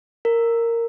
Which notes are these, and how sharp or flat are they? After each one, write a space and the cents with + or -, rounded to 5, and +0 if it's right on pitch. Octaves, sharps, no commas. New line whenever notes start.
A#4 -10